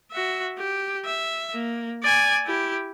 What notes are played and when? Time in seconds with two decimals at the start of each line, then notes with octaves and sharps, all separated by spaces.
0.12 F#4 E5
0.58 G4
1.05 E5
1.54 A#3
2.03 D5 G#5
2.46 E4 G4